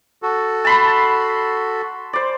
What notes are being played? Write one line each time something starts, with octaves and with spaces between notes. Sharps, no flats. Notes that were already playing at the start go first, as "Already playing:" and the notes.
F#4 A4
A5 B5 C6
C5 D5